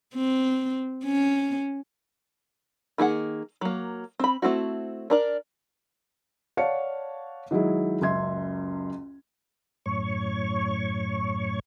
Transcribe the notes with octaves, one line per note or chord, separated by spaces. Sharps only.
C4
C#4
D#3 A#3 G#4 F#5
F#3 A#3
C4 B5
A3 C4 E4 F#4
D4 A#4 D5
C#5 D5 F5 F#5 A5 C#7
D#3 F#3 G#3 E4 G#4
F#1 C#2 E5 C6 G#6
F#2 A2 C#5 C#6